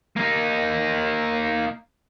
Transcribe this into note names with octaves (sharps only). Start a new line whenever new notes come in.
A#3 D#4